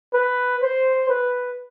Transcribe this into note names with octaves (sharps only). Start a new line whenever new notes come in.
B4
C5
B4